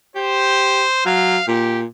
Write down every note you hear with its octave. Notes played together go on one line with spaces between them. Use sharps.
G4 C5
F#3 F5
A#2 G4